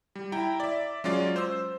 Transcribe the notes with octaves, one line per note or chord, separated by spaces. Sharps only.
G3
E4 G5 A#5
D5 E5
F#3 G#3 C#4 F4 D5
C5 E6